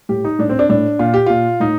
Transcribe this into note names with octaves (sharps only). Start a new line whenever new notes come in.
A2 G4
D#4
A2 D4
C4
D4
A2 D4
A#2 F4
G4
A#2 F4
A2 D#4